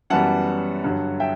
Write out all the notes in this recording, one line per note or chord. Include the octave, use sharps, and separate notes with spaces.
F#2 E3 G3 B3 F#5 A5
G2 D3 F#3
E5 G5